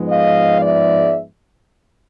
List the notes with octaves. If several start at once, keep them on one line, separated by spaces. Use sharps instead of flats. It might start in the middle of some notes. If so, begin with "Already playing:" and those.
Already playing: G#2 F3 G#3 B3
D#5 F5
D5 E5